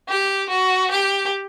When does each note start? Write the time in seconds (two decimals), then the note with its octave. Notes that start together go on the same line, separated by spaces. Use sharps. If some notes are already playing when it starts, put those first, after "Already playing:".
0.09 G4
0.50 F#4
0.91 G4